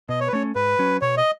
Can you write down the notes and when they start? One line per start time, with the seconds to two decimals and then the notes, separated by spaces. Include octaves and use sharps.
0.09 B2 D#5
0.21 C#5
0.28 B4
0.32 A3 C#4 C#5
0.55 G#2 B4
0.79 F#3 C#4
1.01 B2 C#5
1.17 D#5